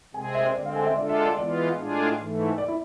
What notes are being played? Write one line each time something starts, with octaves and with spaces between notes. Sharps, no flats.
C3 G#3 C4 G#4 G#5
G#5
E5
C5
D3 G#3 C4 D5
F5
G#5
E5
D3 G#3 D4 F4 A4 D5
E5
D5
E3 G#3 B3 F4 D5
A2 G#3 D4 F4 G#4
G#2 E3 A3
D5
E4